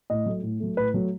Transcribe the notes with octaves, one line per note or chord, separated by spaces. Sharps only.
A2 D#5
F#3 A3
A2
F#3 A3
A2 B4
F#3 A3